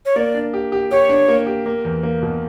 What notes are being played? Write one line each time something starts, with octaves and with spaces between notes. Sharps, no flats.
C#5
A#3 D5
D4
G4
G4
G4 C#5
D4
A#3
G4
A#3
E2
A#3
B2